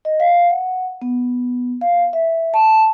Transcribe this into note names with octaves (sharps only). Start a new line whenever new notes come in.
D#5
F5
F#5
B3
F5
E5
A5